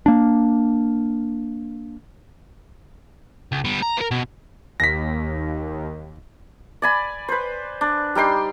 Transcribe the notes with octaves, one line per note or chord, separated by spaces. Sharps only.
A#3 D4
C#2
G3 B3
A#5
B3 A#4
B2
D#2 A#6 B6
D5 G#5 B5
B4 C5
D4
G3 D#4 G5 C6